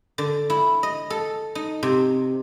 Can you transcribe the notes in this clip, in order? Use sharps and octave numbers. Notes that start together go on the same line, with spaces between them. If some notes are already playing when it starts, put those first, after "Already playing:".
D3
E4
D#5
A4
D#4
C3